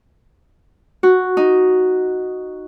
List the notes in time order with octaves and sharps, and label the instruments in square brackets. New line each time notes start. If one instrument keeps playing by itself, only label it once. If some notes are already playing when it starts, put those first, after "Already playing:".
[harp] F#4
D#4